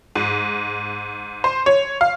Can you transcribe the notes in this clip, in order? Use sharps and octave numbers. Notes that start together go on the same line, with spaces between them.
G#2
C5
C#5
F5